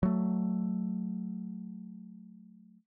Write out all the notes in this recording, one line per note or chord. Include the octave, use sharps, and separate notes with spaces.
F#3 A3